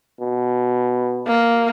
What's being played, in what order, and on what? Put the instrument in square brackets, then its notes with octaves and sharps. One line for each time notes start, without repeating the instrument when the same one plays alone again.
[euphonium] B2
[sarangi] A#3